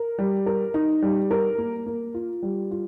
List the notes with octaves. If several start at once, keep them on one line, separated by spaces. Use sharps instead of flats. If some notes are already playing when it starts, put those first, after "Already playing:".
Already playing: A#4
G3
A#4
D#4
G3
A#4
A#3
A#3
F4
G3
F4